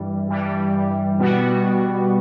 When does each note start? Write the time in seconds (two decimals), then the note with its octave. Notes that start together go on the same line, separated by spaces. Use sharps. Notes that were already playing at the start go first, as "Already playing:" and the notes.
Already playing: G2 E3 G3
0.28 G2 E3 G3
1.18 B2 G3 B3 F#4